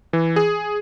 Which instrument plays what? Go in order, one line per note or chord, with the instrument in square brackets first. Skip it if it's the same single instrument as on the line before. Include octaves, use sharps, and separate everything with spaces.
[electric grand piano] E3
G#4